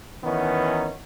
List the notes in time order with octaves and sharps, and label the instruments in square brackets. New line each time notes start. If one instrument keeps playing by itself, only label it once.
[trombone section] D#3 E3 B3 C#4 D#4